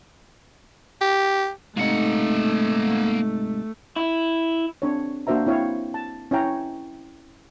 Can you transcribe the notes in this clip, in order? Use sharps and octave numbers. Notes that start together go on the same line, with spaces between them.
G4
G#2 C3 A3 A#3 D#4 F#5
E4
C4 D4 C#5
A#3 D4 F#4 C5 E5 A#5
C4 E4 C#5 F5 G5
A5
C#4 E4 C#5 G5 A#5